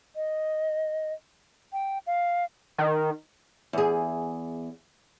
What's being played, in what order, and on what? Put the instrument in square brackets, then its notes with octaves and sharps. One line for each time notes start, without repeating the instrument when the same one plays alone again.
[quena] D#5
G5
F5
[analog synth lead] D#3
[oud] E2 G#4